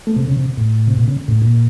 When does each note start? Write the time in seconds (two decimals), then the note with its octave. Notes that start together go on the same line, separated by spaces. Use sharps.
0.07 A3
0.16 C3
0.27 C#3
0.37 C3
0.57 A2
0.87 C3
0.97 A#2
1.08 C#3
1.28 A2
1.42 A#2